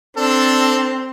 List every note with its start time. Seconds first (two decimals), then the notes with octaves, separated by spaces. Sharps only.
0.17 C4 D4 A4